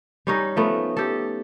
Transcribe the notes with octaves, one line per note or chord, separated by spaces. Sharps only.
G3 C#4 D#4
F3 A3 B3
G4 A4